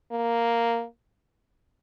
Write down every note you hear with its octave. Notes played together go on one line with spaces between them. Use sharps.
A#3